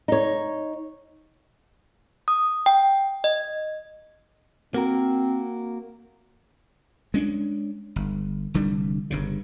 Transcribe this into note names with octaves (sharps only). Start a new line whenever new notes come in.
D#4 C#5
D#6
G5
D#5
A#3 C4 F#4 A#4
G#3 C#4 D4
G1
F1 D3 G3
G1 G2 C#3